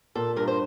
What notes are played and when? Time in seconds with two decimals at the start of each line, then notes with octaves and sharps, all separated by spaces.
0.15 A#2 A4
0.36 G2 A#4
0.48 C5